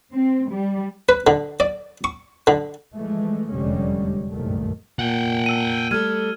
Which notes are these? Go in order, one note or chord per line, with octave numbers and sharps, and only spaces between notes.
C4
G3
B4
D3
D5
C#6
D3
E3 F3 G#3 A3
F1 E2 D3 G3 G#3 C#4
G1 C2 F#2 A#2 D#3 A3
A#2 F#5 G5
E6 D#7
G3 A3 A4 F6 G#6 D#7